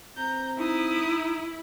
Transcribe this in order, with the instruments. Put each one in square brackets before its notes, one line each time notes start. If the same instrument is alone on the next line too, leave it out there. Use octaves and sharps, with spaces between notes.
[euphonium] C4 [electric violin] A#5 G6
[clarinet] D#4 [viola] E4 [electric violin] D#6